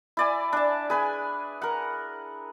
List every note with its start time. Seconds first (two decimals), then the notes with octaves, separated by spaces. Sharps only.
0.17 E4 D5 G#5
0.53 D4 A5
0.90 G#4 B4 G#5
1.62 A#4 F#5